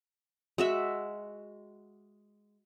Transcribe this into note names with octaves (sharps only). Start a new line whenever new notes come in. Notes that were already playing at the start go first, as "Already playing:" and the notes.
G#3 F#4 E5